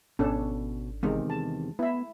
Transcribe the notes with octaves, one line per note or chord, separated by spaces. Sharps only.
G#1 B2 C#4 D4 A4
E2 C3 D#3 G#3
A5
B3 E4 E5